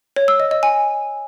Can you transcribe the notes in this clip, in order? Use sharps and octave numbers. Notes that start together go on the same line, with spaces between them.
C#5
E6
D#5
D#5
G#5